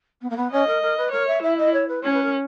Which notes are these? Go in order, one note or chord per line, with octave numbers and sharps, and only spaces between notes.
B3
A#3
B3
C#4 D#5
A#4
A#4
B4
A#4 C#5
E5
E4 E5
D#5
C#5
B4
C#4 C#5
B4
A#4